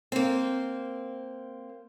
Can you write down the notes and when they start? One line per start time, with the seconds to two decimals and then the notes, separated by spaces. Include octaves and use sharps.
0.12 A#3 C4